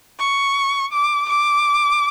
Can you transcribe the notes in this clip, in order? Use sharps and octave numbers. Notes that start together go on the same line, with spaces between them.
C#6
D6
D6